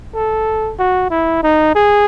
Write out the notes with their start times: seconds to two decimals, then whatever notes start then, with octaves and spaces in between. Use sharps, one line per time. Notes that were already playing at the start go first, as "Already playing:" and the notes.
0.15 A4
0.79 F#4
1.10 E4
1.43 D#4
1.75 G#4